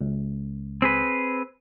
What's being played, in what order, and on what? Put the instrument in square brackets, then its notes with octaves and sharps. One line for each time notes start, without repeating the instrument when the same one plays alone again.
[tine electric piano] C#2
[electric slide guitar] C4 G#4 B4